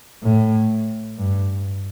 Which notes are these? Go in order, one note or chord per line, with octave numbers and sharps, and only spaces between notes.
A2
G2